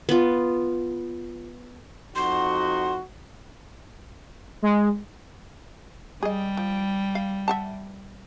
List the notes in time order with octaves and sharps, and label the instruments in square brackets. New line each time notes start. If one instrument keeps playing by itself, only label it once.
[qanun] B3 F4
[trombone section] F2 D#4 F#4 [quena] C6
[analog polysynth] G#3
[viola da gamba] G3 [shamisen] G#4 D#5
[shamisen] F3
F5
E5 F#5 A5